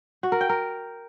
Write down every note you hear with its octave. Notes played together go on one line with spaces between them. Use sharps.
F#4
A#4
G5
A#4